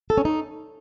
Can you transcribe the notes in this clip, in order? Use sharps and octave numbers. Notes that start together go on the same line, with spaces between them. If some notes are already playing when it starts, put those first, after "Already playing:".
A4
C#4
D#4